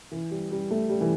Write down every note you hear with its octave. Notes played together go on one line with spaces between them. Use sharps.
E3
G3
G3
A3
G3
E3